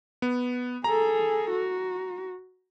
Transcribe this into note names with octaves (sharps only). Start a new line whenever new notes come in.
B3
G#4 A4 A#5
F#4